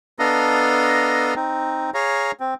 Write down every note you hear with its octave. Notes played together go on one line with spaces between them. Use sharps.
B3 D4 A4 D#5 F5 A#5
C4 D#4
G#4 C#5 F5 A#5
C4